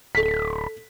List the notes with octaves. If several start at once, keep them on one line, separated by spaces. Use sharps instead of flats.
D1 A4 B6